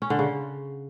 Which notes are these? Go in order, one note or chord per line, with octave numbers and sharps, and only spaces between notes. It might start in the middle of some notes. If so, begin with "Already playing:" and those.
C#4
D3
C#3